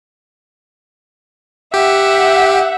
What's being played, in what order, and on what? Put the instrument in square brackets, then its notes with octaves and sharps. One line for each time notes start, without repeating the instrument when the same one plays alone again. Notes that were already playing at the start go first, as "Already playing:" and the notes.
[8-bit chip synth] G4 [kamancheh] E5 F#5